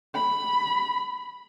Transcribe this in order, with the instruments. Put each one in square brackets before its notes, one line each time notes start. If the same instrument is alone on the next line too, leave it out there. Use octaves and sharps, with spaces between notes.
[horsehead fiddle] B5